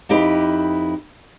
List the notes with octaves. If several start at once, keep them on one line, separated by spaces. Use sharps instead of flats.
F2 D#4 E4 G4 B4